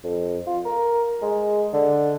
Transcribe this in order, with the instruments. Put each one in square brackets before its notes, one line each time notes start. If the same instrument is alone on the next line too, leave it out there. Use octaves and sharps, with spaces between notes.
[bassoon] F2
F4
A#4
G#3
D3